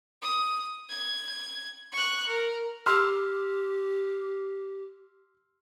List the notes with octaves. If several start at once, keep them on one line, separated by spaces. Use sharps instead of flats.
D#6
G#6
C#6 F#6
A#4
G4 C6 E6 F6